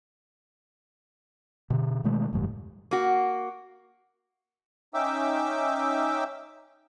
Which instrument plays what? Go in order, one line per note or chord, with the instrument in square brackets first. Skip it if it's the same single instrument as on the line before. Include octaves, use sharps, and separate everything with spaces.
[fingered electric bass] B2 D3
B2 D#3 G#3 A3
F#1 E2 A2 G3
[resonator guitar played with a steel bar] A#3 F#4
[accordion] C#4 D#4 E5 G5 D6 E6